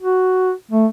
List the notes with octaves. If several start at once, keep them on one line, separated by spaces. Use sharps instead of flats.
F#4
A3